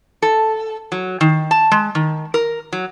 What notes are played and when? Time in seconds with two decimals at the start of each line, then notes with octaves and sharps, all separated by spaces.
0.22 A4
0.92 F#3
1.21 D#3
1.51 A5
1.72 G#3
1.95 D#3
2.34 A#4
2.72 F#3